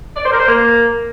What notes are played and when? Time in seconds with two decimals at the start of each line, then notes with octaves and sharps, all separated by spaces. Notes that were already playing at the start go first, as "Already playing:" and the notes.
0.16 D5
0.24 C5
0.32 A#4
0.39 C5
0.47 A#3